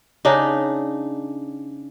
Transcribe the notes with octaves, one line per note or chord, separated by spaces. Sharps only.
C#3 D4 D#4